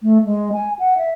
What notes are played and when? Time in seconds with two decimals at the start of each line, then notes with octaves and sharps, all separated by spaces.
0.03 A3
0.25 G#3
0.53 G#5
0.79 F#5
0.97 E5